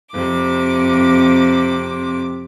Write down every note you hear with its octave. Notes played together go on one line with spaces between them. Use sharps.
F2 C3 D6